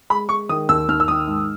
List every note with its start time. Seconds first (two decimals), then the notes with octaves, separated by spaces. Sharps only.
0.10 G#3 B5
0.29 G#3 C#6
0.49 D#3 D#6
0.69 D#2 E6
0.88 D#2 F6
1.00 E6
1.08 D#3 D#6
1.27 G#2